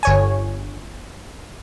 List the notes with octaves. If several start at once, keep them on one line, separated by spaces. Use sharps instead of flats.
G1 C#5 G#5